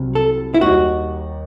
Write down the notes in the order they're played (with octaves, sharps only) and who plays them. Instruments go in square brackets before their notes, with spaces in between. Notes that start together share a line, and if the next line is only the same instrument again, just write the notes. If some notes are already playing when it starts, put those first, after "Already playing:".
Already playing: [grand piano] C2 C3 F#3 C4
[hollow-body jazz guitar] A4
E4
[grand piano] D#2 D#3 G3 D#4 [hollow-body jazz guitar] F#4